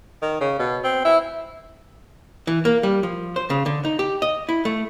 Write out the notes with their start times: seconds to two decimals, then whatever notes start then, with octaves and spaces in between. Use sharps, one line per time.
0.22 D#3
0.41 C#3
0.59 B2
0.84 C4
1.05 E4
2.47 E3
2.65 A#3
2.83 G3
3.03 F3
3.36 C5
3.50 C#3
3.66 D3
3.85 D#4
3.99 G4
4.22 D#5
4.49 E4
4.65 A3